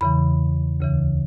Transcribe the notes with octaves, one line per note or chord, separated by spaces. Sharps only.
E2 C#3 E3 B5
D2 C#3 E3